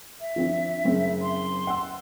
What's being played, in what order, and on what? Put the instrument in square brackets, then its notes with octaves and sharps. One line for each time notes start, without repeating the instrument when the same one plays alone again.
[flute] E5
[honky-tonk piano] F3 C4 D4
F#1 C4
[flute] C6
[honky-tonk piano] F#5 E6